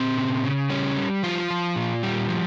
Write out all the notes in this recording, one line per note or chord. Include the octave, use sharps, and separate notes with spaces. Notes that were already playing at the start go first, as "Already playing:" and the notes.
Already playing: A#2 C4
C#3
C#3
G3 C#4
G3
F3 F4
F3
A#2
G3
F3